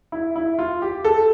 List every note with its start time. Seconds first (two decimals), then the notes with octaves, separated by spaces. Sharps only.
0.12 E4
0.36 E4
0.59 F4
0.82 G4
1.05 A4